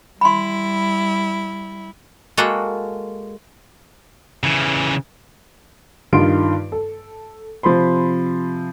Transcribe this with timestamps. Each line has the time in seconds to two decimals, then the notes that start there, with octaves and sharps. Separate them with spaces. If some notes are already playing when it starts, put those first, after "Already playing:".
0.21 G3 E4 B5 C6
2.37 G#3 A#3 F#4 A4 F#5 G5
4.44 C#3 E3
6.13 G2 D#3 F4 C6 D7
6.72 A4
7.63 C3 F3 C4 B5 C6